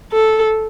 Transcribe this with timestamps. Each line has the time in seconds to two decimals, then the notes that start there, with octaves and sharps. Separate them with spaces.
0.12 A4